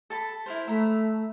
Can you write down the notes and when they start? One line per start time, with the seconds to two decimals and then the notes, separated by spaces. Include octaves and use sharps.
0.10 A4 A5 B5
0.46 E4 A#4 C5
0.68 A3 E5 A#5 B5